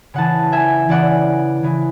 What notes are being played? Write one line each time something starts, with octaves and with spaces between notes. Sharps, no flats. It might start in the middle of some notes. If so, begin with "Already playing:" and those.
C#3 E3 F#5 A5
E5 G#5
C#3 E3 D5 F#5
C#3 E3